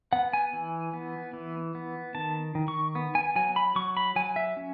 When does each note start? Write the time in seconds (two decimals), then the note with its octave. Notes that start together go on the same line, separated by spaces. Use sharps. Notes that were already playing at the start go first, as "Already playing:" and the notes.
0.13 B3 F#5
0.33 G#5
0.53 E3
0.93 B3
1.33 E3
1.75 B3
2.15 D#3 A5
2.55 D#3
2.68 C#6
2.95 B3
3.15 G#5
3.36 F#3 G#5
3.56 B5
3.75 F#3 C#6
3.97 B5
4.16 F#3 G#5
4.36 E5
4.57 C#4